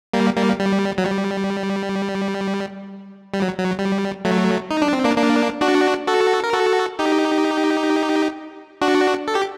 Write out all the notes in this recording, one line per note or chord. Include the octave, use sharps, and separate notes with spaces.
G3 A#3
G3 A#3
G3
F#3
G3
G3
F#3
F#3
G3
F#3 A3
D#4
D4
C4
A#3 D4
A#3 D4
D4 F#4
F#4 A4
A#4
F#4 A4
D#4 G4
D4 F#4
A4
G4